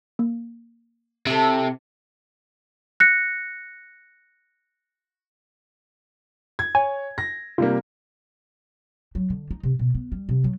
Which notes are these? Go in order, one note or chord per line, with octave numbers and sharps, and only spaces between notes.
A#3
C3 E4 A4
F#6 A#6 C#7
G#6
C#5 G#5
A#6
C3 G3 A#3 F4
F#3
D3
D#4
C3
B2
B3
G3
C3
F#3